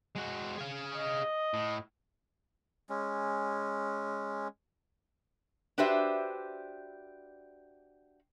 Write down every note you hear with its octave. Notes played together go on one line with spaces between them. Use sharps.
G#3 F#4
G#4 F5
D#5
A2
G#3 C#4
D4 F#4 G4 B4 C5 E5